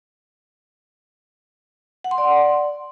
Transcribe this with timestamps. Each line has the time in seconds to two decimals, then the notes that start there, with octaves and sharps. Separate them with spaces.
2.04 F#5
2.11 C6
2.18 D5